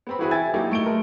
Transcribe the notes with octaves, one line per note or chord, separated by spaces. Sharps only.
B3 C4 B5
E3 C4 E4 F#4 G#4 B4
E5 G5 G#5 G#6 A6
F#3 A#3 D#4 E4 F#4 G4
A3 D7 G7
G#3 A3 A#4